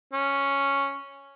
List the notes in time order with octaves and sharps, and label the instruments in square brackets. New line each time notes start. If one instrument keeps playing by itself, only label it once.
[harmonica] C#4